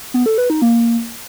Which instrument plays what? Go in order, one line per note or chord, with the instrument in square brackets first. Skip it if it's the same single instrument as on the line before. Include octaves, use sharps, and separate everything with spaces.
[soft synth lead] B3
A4
B4
D#4
A#3